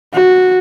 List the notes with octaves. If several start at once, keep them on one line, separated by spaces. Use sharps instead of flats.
F#4